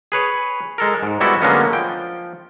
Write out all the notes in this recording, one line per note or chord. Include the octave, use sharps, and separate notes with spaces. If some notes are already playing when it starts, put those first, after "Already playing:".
G#4 B4 C#5
G#3 A4 A#4
G#2
G3 G#3 B3 E4 F#4 A4
D3 F#3 G#3 A#3 B3 C#4
F3 G5